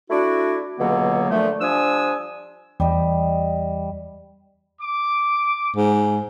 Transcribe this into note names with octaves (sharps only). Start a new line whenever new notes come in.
A3 D4 E4 F#4
C#2 B2 D3 F#3 A#3 B3
A#2 D3 F3 A3
F3 G3 D4 G#5 D#6 E6
E2 G3 D#5
D6
G#2